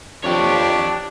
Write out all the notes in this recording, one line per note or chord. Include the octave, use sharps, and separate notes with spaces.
F2 D4 G4 C#5